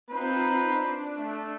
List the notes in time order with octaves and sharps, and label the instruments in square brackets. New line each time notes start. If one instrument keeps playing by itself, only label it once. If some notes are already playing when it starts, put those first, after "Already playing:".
[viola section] C4 D#4 F4 [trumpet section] B4 C5 A#5
[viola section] D4
[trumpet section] A3